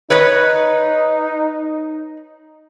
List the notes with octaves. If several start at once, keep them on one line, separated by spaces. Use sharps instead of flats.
D#4 B4 C#5 D#5